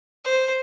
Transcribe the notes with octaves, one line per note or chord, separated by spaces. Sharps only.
C5